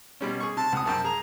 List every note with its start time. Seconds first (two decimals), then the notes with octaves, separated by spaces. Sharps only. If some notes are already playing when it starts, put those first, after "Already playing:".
0.21 B2 G3 C#4
0.40 G#4 C#6
0.57 C3 A5
0.72 C#2 F#5 D#6
0.86 C2 F#2 G5 A5
1.04 G#4 A#5